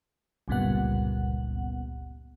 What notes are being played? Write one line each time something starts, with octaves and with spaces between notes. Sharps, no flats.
G1 C#2 G2 A#2 B3 F#5